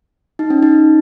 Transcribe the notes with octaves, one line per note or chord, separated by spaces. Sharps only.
D#4
C#4
D#4